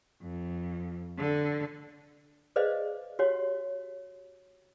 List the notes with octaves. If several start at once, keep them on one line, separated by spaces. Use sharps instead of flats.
F2
D3
G#4 B4 C5 D5 D#5 F5
F#4 G4 C#5